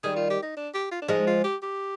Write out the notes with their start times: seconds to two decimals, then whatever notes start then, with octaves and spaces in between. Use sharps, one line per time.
0.03 D#3 G3 G#4
0.16 F4
0.30 G4
0.42 D#4
0.57 D4
0.74 G4
0.91 F4
1.02 D4
1.08 F3 G#3 D#4
1.27 F4
1.44 G4
1.62 G4